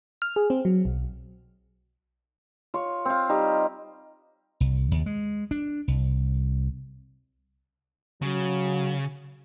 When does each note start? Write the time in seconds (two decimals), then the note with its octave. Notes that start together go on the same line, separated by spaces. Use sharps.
0.22 F6
0.36 G#4
0.50 C4
0.65 F#3
0.85 B1
2.74 F4 C#5
3.05 C4 F5
3.29 G3 D#4
4.60 C2
4.91 D#2
5.06 G#3
5.51 D4
5.88 C2
8.22 C#3 F#3